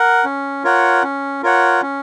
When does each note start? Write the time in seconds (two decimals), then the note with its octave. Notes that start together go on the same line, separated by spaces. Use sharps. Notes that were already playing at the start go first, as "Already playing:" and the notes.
Already playing: A#4 F#5
0.24 C#4
0.64 F4 A#4 C#5 F#5
1.03 C#4
1.43 F4 A#4 C#5 F#5
1.82 C#4